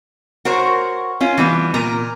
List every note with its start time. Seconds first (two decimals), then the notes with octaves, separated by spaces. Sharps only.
0.45 F#4 A#4 C5 C#5
1.21 C#4 F4
1.38 E3 G3 B3
1.74 A#2 A#4 A#5